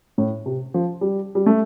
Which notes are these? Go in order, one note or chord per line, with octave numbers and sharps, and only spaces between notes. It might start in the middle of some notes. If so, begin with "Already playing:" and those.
A2
C3
F3
G3
G3
A3